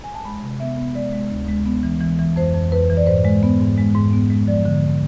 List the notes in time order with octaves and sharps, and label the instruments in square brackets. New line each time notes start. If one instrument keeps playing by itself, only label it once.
[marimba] G#5
A5
G#3 B5
C3
B3 E5
B3
G#3 D5
G#3
D2
G#3
B3
E3
E3
E3
F2 C5
F2
F2 B4
E3
D5
G#2 C5
G#3
B3
G#2
G#3
G#2
B3
G#3
F3 D5
D3